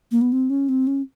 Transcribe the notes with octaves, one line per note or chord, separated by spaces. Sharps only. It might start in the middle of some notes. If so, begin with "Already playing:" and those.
A#3
B3
C4
C#4
C4
C#4